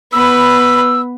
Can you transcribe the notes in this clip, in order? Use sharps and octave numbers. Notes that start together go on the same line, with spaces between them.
B3 B4 B5 E6